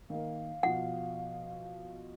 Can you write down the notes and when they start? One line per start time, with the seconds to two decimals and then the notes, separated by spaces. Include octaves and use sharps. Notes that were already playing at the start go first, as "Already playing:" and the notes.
0.10 D#3 A#3 F5
0.63 B2 F3 F#5